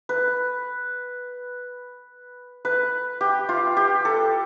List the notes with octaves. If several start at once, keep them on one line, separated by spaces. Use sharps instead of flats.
B4
B4
G4
F4
G4
A4